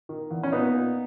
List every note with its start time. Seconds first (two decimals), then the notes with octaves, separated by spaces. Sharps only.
0.09 D#3
0.31 E2
0.43 C#4
0.52 A#2 B3 D#4
0.74 A#2